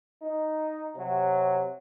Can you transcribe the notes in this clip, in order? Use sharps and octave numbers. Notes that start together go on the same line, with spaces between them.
D#4
C3 F#3